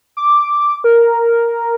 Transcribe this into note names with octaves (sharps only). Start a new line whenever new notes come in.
D6
A#4